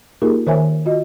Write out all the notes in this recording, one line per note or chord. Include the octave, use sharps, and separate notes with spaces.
A#3 D#4 F4 G4 G#4 A#4
D#3 A#4 C5 C#5 E5 G#5
F4 F#4 D#5